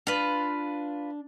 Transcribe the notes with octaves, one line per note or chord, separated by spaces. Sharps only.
D4 F4 B4